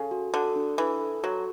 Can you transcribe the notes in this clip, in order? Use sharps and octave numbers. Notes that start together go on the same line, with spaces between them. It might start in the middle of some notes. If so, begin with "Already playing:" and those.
Already playing: C#3 A4
F#4
D3 A4
D4
E3 A4
A4
F#3 F#4